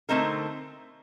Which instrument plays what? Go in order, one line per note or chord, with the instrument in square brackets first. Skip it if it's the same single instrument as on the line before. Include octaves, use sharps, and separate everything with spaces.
[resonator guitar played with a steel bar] D3 A3 C4 D#4 A#4